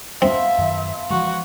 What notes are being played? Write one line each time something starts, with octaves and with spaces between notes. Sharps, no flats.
F3 B3 C4 F4 E5
F#2 D#3 A5
E3 F3 G#3 F#4